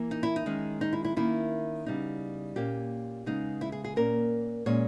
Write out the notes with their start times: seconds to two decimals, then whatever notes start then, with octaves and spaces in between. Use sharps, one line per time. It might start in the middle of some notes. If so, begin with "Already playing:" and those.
Already playing: E3 A#3
0.11 D#4
0.23 E4
0.36 D#4
0.46 D#3 G#3 C#4
0.81 D#4
0.93 E4
1.05 E4
1.16 D#3 A#3 C#4 E4
1.86 C#3 G3 B3 D#4
2.56 A#2 A#3 C#4 G4
3.26 C#3 G#3 B3 D#4
3.61 E4
3.72 G#4
3.84 G#4
3.96 A#2 A#3 C#4 A#4
4.66 A#2 G#3 C#4 C#5